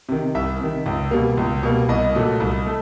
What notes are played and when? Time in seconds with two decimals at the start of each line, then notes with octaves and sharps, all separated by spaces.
0.09 C3 D#3
0.35 C2 E5
0.60 C3 D#3
0.86 C#2
1.11 B2 G3 A#3
1.37 C#2
1.63 B2 G3 A#3
1.89 C2 D#5
2.15 A#2 F#3 A3
2.40 C2
2.66 A3